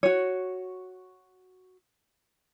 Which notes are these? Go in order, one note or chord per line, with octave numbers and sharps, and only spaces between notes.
F#4 C#5